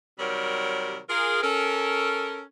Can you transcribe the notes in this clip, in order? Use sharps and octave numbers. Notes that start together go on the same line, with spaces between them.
C3 D#3 F#3 G3 A#4 C#5
F4 G#4 A#4
C#4 A4 A#4